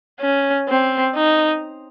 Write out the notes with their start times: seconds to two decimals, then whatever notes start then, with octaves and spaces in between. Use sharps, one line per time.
0.20 C#4
0.68 C4
1.15 D#4